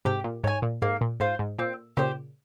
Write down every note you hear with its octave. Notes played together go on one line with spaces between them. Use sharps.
G#2 C3 G4
A#2
G#2 C#5 G#5
A#2
G#2 A#3
A#2
G#2 F4 C5
G#2
A#2 C4
A#2 C#3 G4 C5